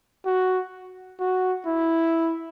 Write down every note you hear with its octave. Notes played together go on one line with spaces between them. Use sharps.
F#4
F#4
E4